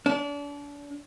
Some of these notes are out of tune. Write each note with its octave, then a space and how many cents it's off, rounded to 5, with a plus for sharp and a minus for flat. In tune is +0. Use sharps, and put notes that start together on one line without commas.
D4 -35